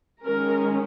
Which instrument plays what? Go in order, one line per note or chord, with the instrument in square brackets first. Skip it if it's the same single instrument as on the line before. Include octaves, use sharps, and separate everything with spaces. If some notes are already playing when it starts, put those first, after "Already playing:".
[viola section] D#3 G#3 C#4 A#4